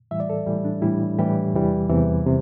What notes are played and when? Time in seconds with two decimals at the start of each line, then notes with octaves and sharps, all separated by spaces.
0.11 A2 E3 G3 E5
0.20 D5
0.30 A4
0.46 A2 E3 G3
0.65 D4
0.82 A2 E3 G3 E4
1.19 A2 E3 G3 G4
1.53 E2 C3 E3 G3
1.89 E2 C3 E3 G3
2.26 C3